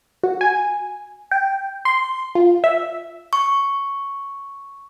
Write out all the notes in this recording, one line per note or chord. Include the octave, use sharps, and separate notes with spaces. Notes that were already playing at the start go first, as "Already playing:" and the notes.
F#4
G#5
G5
C6
F4
E5
C#6